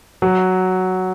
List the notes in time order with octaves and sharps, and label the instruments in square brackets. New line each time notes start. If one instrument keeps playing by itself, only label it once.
[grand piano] F#3